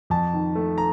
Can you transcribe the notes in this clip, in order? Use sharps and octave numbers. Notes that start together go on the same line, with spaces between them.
F2 A5
D#3
A3
A#5